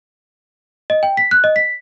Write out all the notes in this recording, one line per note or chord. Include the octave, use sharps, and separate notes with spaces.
D#5
G5
B6
F#6
D#5
B6